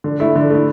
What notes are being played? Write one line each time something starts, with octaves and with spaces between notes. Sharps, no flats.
D3
A3 E4
D3
A3 E4